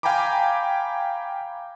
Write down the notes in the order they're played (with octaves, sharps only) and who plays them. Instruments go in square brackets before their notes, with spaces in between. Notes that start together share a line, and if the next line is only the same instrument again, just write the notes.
[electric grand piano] F5 G5 G#5 A#5 B5 D6